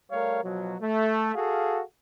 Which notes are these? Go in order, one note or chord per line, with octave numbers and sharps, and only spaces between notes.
G3 A3 A#4 C#5 F5
B2 F3 F#3
A3
F#4 G#4 A4 F5